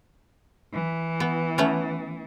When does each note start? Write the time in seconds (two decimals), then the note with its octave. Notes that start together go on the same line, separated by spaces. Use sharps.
0.74 E3
1.20 B3
1.58 A3 B3 C#4